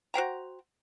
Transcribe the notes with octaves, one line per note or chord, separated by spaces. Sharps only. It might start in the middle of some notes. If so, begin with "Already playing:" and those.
F#4 C5 G5 A#5